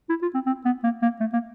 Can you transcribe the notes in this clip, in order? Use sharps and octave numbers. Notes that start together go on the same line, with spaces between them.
E4
F4
C4
C4
B3
A#3
A#3
A3
A#3